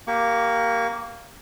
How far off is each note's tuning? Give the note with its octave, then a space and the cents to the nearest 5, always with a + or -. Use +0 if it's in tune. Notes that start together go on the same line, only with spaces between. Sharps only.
A#3 +0 G4 -10 C#6 +30